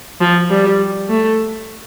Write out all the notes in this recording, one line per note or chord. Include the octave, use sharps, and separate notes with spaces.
F3
G3
A3